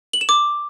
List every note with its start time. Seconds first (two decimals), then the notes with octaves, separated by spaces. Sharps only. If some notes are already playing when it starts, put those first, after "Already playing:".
0.13 F#7
0.21 E7
0.29 D6